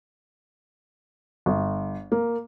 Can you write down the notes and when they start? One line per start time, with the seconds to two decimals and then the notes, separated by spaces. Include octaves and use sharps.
1.46 G1
2.12 A#3